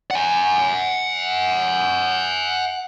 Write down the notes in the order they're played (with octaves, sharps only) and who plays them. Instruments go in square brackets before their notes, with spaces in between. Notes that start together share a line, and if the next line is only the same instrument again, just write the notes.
[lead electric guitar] F#5 G#5